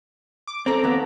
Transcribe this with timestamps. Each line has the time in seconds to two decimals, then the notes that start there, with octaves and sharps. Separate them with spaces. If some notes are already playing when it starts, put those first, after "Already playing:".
0.47 D6
0.66 C4 A4 A#5 D6
0.84 D#2 B3